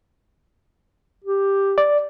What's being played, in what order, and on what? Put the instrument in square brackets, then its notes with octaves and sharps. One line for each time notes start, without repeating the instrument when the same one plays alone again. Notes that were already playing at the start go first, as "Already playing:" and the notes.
[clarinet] G4
[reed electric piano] D5